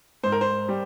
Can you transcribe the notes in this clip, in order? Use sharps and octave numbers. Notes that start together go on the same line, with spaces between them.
G#2 C5
A#4
C5
G3